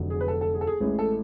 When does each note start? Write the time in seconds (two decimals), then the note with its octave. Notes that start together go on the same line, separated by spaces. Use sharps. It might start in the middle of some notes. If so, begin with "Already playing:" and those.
Already playing: F1 F2 D3 F#3
0.10 G#4
0.21 B4
0.28 A4
0.41 A4
0.54 G#4
0.61 A4
0.67 G#4
0.80 A1 A2 G#3 G#4
0.99 A4